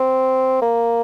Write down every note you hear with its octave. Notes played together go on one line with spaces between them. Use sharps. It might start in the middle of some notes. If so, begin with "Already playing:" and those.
Already playing: C4
A#3